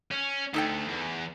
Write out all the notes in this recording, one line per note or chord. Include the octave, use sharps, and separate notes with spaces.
C#4
D2 D#4 A4 G5
E2